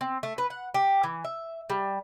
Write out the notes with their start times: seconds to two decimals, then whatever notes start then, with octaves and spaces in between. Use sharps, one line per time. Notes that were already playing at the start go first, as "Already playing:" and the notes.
0.01 C4
0.23 A3
0.38 B4
0.50 F#5
0.74 G4
1.03 E3
1.24 E5
1.70 G3